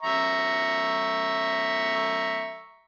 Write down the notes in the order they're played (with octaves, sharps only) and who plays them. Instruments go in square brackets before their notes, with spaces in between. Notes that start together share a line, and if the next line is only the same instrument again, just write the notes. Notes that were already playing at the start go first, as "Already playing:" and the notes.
[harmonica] E5 A#5 C#6